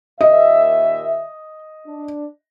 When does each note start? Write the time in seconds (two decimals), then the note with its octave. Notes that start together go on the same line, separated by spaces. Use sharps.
0.21 D#2 A#2 D#5 E5
1.87 D4